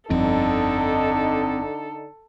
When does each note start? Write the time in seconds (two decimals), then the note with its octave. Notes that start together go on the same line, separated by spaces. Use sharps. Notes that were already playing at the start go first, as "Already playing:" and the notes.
0.10 G1 F2 D3 C4 D4 D#4 A4